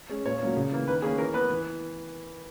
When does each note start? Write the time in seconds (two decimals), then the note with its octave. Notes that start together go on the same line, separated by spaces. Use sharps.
0.09 G#3 C#4
0.25 A#2 C#5
0.40 F#3 A#3 C#4
0.57 C#3
0.72 E3 A#3
0.87 D#3 B4
1.02 A#3 C#4 G#4
1.18 E3 A#4
1.34 B3 B4
1.50 E3